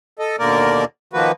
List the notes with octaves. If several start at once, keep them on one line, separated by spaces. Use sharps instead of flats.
A4 D#5
D#2 B2 D3 A#3 A#4 D5
D#3 F3 A#3 F#4 B4